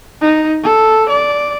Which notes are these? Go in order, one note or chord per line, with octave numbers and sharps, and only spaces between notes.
D#4
A4
D5